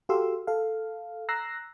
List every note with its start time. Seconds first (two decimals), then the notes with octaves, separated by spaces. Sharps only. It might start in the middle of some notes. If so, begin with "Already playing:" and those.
0.09 F#4 G4 A4 F5 C6 E6
0.47 A4 F5
1.29 A#5 E6 F#6 A#6 C7